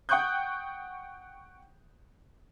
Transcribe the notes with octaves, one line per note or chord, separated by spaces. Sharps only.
F#5 G5 C#6 D#6 F#6 G6